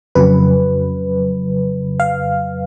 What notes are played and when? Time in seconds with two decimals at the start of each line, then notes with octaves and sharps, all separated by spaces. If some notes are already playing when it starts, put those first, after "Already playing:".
0.15 F2 C#3 F#3 B4
2.00 F5